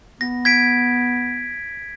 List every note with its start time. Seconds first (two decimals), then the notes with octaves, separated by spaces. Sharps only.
0.21 B3 A#6
0.45 G#6 B6 D7